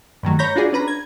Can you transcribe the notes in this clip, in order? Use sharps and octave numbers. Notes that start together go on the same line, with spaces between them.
G2 D#3 F#3 A3
C#5 A#5 B5 G6 A#6
D4 F4 F#4 G#4 D5
C#4 D4 B4 A#5 B5
G#6